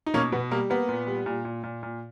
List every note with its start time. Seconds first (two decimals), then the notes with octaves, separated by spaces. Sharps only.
0.06 D#4
0.14 B2 A#3 C#4
0.32 B2 B3
0.51 G3 A#3
0.70 A#3 B3
0.89 A#2
1.07 G3
1.26 A#2
1.45 A#2
1.64 A#2
1.83 A#2